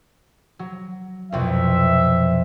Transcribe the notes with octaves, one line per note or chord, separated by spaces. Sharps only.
F#3
C2 F2 B2 E5